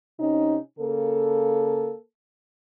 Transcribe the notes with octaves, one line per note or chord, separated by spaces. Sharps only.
C3 C#4 D#4
C#3 A#3 A4